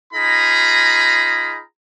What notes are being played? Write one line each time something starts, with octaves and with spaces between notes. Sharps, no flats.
D#4 F4 G#4 A#5 B5